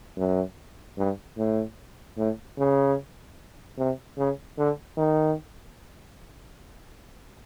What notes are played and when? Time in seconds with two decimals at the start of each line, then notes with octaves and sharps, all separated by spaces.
0.17 F#2
0.98 G2
1.38 A2
2.17 A2
2.58 C#3
3.78 C3
4.18 C#3
4.58 D3
4.97 D#3